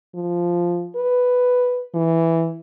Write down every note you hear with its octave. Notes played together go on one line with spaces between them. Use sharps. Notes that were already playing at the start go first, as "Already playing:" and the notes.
F3
B4
E3